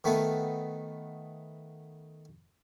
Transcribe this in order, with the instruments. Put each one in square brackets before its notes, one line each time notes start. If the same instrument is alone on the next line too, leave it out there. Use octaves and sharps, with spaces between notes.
[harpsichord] D#3 A3 B3 D#4